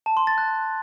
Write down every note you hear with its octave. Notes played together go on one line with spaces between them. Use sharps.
A5
C6
A6
F#6